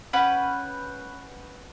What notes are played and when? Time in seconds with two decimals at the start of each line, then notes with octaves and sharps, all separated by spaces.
0.13 C#4 B4 F#5 G5